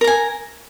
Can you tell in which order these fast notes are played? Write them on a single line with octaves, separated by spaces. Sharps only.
A#4 A#5 G#5